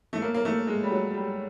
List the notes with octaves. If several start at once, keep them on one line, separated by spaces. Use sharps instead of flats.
A3
A#3
A#3
A3
G#3
G3
F#3
G3